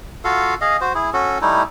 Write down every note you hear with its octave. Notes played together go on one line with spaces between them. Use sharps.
F4 F#4 A4 F5
G#4 D#5 F5
F#4 C5
E4 G#4
C#4 F#4 A4
G3 A3 D#4 E4